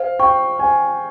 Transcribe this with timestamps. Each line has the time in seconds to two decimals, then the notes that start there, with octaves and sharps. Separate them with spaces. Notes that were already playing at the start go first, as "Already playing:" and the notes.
Already playing: C5 F5
0.19 G5 C#6
0.59 C5 G#5